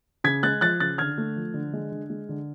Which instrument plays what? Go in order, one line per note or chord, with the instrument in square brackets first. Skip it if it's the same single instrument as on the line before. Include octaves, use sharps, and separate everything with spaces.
[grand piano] C#3 G#6 B6
G#3 F#6 A6
F3 F#6 A6
C#3 F#6 A6
D3 F6 G#6
A3
F3
D3
G#3
D3
G#3
D3